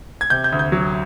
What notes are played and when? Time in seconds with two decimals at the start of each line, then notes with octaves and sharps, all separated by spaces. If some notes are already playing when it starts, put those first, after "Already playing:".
0.21 G#6
0.30 C3 G6
0.44 G6
0.52 D2
0.59 G6
0.72 F#3